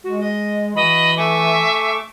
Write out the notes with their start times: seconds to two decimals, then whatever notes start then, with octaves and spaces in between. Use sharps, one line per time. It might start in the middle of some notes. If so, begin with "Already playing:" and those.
0.04 G#3 F#4
0.20 D#5
0.76 E3 F#4 D#5 B5
1.17 A3 E5 G#5 C#6 D6